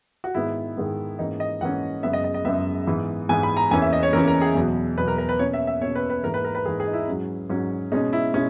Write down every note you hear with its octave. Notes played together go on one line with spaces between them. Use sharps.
F#4
G#2 D#3 G#3 B3 E4
G#2 D#3 G#3 B3
G#2 E3 A#3 C#4 D#4
D#5
G#2 E3 A#3 C#4 F#5
F#2 C#3 G#3 B3 E5
D#5
D#5
D#5
F#2 C#3 G#3 B3 E5
G#2 E3 B3
G#2 E3 B3 G#5
B5
A#5
E2 C#3 E3 A#3 C#4 G#5
E5
D#5
C#5
E2 C#3 E3 A#3 C#4 A#4
A#4
G#4
E2 B2 F#3
E2 B2 F#3 B4
A#4
A#4
B4
B2 A#3 C#4 C#5
E5
E5
B2 A#3 C#4 C#5
B4
B4
G#2 E3 A#3 A#4
B4
A#4
B4
G#2 E3 A#3 G#4
G#4
D#4
E4
G#2 F#3 C#4
G#2 F#3 C#4
B2 G#3 C#4 D#4
E4
B2 G#3 C#4